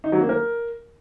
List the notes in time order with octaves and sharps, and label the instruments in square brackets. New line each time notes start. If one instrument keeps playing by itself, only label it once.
[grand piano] D#4
F#3
A#3
A#4